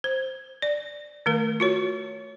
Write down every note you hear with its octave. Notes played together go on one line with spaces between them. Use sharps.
C5
D5
D#3 A3 A#4
F4 F#4 C#5